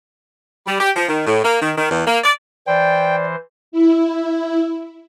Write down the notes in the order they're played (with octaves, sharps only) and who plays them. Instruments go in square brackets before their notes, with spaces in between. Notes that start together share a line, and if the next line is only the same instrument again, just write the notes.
[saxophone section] G3
G4
F3
D#3
A2
A#3
D#3
D#3
E2
A#3
D5
[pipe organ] E3 C5 [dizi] D5 [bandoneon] G5
[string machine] E4